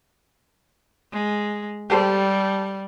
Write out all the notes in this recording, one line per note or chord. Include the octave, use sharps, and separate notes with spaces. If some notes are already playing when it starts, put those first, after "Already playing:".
G#3
G3 G4 A4 C5